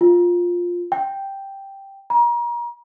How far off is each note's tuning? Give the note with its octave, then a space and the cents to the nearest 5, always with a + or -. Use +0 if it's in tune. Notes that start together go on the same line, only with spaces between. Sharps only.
F4 +10
G5 +0
A#5 +35